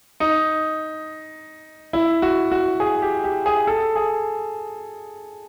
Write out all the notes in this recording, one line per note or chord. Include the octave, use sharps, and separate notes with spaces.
D#4
E4
F#4
F#4
G#4
G4
G4
G#4
A4
G#4